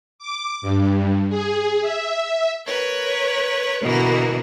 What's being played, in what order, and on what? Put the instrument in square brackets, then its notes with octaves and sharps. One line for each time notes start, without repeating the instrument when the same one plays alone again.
[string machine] D6
G2
G#4
E5
[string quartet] A#4 B4 C#5
B2 D3 E3 A#3 B3